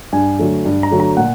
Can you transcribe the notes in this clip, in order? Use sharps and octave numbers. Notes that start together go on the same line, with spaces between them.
G2 G#5
D3 F#3 A3
G2
A#5
D3 F#3 A3
A#5
A#2 F#5